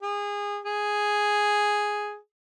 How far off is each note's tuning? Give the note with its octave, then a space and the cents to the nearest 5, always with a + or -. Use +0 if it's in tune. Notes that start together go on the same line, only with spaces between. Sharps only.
G#4 -25
G#4 +0